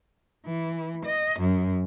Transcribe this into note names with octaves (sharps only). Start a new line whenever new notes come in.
E3
D#5
F#2